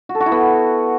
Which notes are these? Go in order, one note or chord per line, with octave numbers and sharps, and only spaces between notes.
F#4
A4
F#4
E4
B3